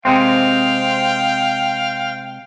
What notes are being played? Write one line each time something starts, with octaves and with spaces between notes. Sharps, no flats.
C3 G#3 C4 F5 G5